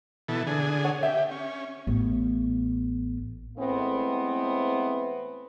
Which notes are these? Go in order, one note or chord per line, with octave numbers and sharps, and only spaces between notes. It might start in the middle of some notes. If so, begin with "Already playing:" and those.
B2 E3 A4
D3 G#4
C#5 F#5
G4 E5
C#4
A1 B3
A2 E3 G#3 A3 B3 C4